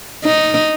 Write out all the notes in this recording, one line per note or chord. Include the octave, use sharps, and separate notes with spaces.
D#4